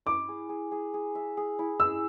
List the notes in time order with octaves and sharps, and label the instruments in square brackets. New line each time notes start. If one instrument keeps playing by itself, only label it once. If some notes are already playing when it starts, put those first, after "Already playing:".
[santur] E4 [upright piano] D6
[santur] G#4
G#4
G#4
G#4
E5
G#4
E4
[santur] G#4 [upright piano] E6